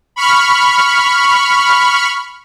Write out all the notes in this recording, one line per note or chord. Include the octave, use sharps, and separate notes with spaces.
B5 C#6 F6